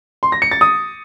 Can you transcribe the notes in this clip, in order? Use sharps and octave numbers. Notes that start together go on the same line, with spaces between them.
C6
A#6
C#7
A6
D#6